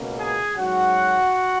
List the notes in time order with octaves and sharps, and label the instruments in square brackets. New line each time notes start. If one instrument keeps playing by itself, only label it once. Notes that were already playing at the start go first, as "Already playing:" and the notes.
Already playing: [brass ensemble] C#2 B2 A#3 C#4
G#4 G#5
G#2 F#3 C#4 F#4 F#5